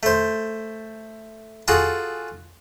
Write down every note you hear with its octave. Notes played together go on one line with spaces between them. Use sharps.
A3 C5
F4 F#4 G#4 A4